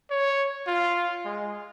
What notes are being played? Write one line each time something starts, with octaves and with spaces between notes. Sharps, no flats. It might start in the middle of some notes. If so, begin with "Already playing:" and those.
C#5
F4
G#3